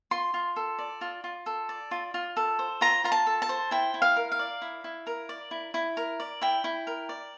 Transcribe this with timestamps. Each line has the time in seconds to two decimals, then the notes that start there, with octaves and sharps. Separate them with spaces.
0.11 F4 C6
0.34 F4
0.56 A4
0.78 D5
1.01 F4
1.24 F4
1.46 A4
1.69 D5
1.91 F4
2.14 F4
2.37 A4
2.59 C5
2.81 F4 A#5
3.04 F4 A#5
3.12 A5
3.26 A4
3.42 A5
3.49 C5
3.71 E4 G5
3.94 E4
4.02 F5
4.16 A#4
4.32 F5
4.39 D5
4.62 E4
4.84 E4
5.07 A#4
5.29 D5
5.51 E4
5.74 E4
5.97 A#4
6.20 D5
6.41 E4 G5
6.64 E4
6.87 A#4
7.09 D5